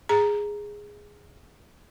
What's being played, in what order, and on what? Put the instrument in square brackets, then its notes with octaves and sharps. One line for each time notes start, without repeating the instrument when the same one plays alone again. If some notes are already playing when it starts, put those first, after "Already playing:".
[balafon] G#4 A#5